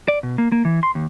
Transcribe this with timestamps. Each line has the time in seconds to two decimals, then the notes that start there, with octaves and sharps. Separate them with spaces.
0.08 D5
0.23 B2
0.38 A#3
0.52 A#3
0.65 E3
0.83 C6
0.95 D#2